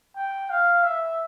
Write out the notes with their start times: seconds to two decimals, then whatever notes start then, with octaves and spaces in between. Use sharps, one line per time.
0.15 G5
0.50 F5
0.83 E5